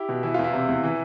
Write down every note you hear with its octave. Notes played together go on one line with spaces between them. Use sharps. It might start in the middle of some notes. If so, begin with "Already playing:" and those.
Already playing: E4 G4
B2
E3 E4
E2 F4
E4
C3
E2
E3